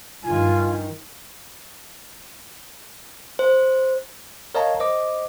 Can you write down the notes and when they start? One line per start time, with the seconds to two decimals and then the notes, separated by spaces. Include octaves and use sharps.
0.24 G2 D#3 F4 G#5
3.39 C5
4.55 A#4 C#5 D#5 F5 A5 A#5
4.80 C5 D#5 D6